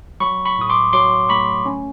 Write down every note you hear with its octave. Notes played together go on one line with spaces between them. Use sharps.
F#3 B5 C#6
B5 C#6
A2 D#6
C6 D6
F#3 C6 D6
A3 B5 C#6
C#4